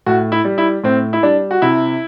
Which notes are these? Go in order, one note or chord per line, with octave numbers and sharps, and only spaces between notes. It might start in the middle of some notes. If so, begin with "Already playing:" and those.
A2 F#4
E4
G3
E4
A2 C4
E4
G3 D4
F#4
C3 E4